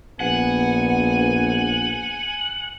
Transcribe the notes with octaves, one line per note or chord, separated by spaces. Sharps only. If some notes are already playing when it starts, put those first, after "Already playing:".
A#1 B3 F#5 G#5